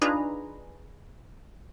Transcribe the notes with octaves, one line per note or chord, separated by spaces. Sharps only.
D4 D#4 F4 G#4 B4 A#5